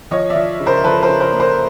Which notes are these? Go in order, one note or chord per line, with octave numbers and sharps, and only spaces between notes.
F3 C#5 D#5
D5 E5
F3
C#3
A#4 C5
F3 A4 B4
A#4 C5
C#3
A#4 C5
A#3
A#4 C5